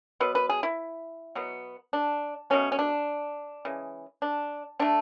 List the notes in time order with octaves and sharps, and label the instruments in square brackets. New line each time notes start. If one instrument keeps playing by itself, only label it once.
[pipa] B2 F#3 B4
B4
G#4
E4
B2 F#3 B3
D4
B2 F#3 A3 C#4
C#4
D4
C#3 E3 G#3
D4
D3 A3 D4